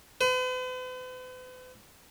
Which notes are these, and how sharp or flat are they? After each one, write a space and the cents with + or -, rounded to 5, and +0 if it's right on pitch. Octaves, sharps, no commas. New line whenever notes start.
B4 +45